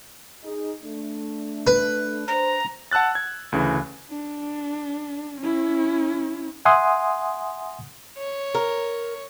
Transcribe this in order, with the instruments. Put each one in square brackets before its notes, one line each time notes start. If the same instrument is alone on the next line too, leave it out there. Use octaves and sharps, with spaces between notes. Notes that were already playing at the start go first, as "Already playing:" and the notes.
[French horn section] D#4 G#4
A3 D4
[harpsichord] B4
[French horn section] D4 C5 [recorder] A#5
[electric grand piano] F#5 A5 E6 F#6 A6
G#6
D2 C#3 E3
[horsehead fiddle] D4
C#4 E4
[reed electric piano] E5 F#5 G#5 C6 D#6
[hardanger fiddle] C#5
[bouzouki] A#4